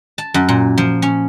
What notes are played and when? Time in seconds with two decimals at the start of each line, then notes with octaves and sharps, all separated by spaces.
0.18 A5
0.34 F#2
0.49 A#2
0.78 F3
1.02 C#4